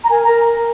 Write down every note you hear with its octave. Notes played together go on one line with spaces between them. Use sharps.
A#5
A#4 G#5
A#4 A#5